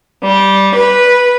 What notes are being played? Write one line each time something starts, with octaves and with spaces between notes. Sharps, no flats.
G3
B4